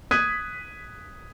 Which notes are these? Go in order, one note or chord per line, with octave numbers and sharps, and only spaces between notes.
D#6 F#6 G#6 B6 D#7